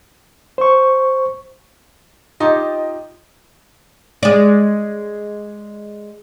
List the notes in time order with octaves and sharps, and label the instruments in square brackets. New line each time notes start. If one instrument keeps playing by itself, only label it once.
[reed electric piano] C5 C#6
[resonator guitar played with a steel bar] D#4 F4 G4 [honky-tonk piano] D#5
[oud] G#3 D5